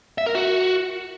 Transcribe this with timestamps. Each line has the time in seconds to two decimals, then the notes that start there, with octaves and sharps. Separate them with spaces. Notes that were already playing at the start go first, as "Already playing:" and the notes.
0.18 E5
0.26 A#4
0.35 F#4